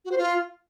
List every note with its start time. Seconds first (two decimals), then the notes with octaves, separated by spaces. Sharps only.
0.05 F#4
0.11 C5
0.18 F4